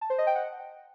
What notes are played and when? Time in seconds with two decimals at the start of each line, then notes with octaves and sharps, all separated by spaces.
0.01 A5
0.10 C5
0.18 D#5
0.27 G5
0.35 F#5